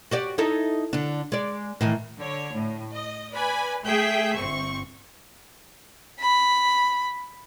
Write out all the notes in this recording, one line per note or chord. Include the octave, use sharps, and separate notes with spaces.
F#4 G4 D5
D#4 E4 A4
D3 D4
G#3 D5
A2 D#3 E3
D3 C#5
A2
D#5
B4 D5 G#5 B5
A3 G#4 E5 G5 G6 B6
G1 C4 C#6
B5